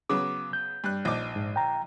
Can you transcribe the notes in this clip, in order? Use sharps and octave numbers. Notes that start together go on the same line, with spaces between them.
C#3 F#3 B3 D6
G6
G2 F#6
A#1 D#4 D6
G#2
G5 A#5